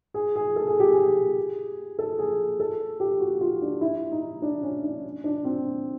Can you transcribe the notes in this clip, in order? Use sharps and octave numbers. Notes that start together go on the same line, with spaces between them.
G#4
G#4
A4
G#4
G4
G#4
A4
G#4
A4
G4
F#4
F4
D4
E4
D#4
D4
C#4
D4
D4
C4